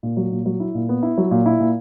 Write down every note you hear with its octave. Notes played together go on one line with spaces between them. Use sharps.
A#2
F#3
A#2
F#3
E4
A#2
B3
E4
F#3
A#2
E4
A#2